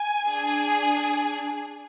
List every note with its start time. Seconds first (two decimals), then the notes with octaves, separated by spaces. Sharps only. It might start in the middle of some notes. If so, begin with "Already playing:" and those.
Already playing: G#5
0.27 D4 G#4